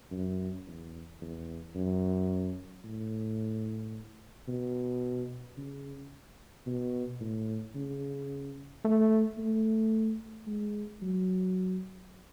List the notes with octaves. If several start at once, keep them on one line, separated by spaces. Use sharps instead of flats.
F#2
E2
E2
F#2
A2
B2
C#3
B2
A2
C#3
A3
A3
G#3
F#3